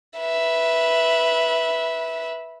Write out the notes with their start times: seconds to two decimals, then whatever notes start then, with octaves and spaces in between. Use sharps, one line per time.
0.19 B4 E5